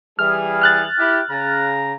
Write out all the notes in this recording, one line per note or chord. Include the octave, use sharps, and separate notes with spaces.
E3 G3 G#4 F6
F6 F#6 A6
E4 G4
C#3 A#5